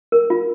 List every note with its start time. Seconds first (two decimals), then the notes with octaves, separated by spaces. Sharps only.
0.12 A#4
0.30 F4